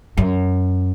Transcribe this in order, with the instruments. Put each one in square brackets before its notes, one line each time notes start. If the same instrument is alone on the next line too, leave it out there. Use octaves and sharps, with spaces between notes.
[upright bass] F#2